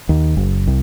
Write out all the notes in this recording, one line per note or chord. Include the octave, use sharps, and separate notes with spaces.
D#2
F#1
C2